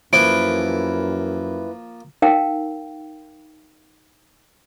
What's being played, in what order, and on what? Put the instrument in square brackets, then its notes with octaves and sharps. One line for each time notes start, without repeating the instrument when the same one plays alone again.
[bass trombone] F#2 [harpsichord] F3 A#3 [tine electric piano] E4 B4 [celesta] D7
[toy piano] D#4 A#4 F5 G5